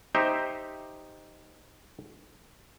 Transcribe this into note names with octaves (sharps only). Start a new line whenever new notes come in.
D#4 G4 C5 E5